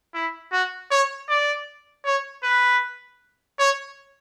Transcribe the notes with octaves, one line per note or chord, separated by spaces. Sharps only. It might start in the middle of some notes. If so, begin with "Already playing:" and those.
E4
F#4
C#5
D5
C#5
B4
C#5